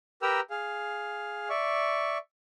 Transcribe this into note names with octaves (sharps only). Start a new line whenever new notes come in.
G4 A#4 B4 G5 A#5 E6
G#4 F5
D5 E5 C#6